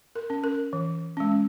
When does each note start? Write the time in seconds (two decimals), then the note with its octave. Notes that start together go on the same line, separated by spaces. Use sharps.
0.15 A#4
0.30 C#4
0.44 A#4
0.73 E3
1.17 G#3 C#4